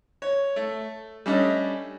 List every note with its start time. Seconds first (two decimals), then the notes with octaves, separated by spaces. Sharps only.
0.22 C#5
0.56 A3
1.26 G3 A3 C#4 D4 D#5